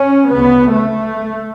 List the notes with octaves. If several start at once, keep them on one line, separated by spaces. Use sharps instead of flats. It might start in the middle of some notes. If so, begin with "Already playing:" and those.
Already playing: C#4
D2 C#3 B3
A3